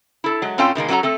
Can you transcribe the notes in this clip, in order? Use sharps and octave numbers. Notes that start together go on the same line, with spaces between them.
E4 A4
F#3 G#3
A2 C4 C#4 F4 A4 G5
B2 D#3 G#3 A#3
F#3 A#3 C#4 F#4 A4 A#5
A3 C4 A4